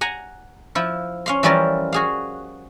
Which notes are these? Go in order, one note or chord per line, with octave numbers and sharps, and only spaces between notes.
F#5 G#5 A#5
F3 E4
C#4 F5 C6
E3 F3 G3 C#4 F4 A#4
F#4 G#4 F5